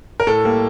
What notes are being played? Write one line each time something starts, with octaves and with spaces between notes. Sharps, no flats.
A#4
A2 A4
G3 A#3